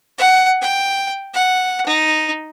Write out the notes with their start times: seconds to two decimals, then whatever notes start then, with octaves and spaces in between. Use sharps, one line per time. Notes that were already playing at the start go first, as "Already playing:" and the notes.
0.18 F#5
0.62 G5
1.34 F#5
1.86 D#4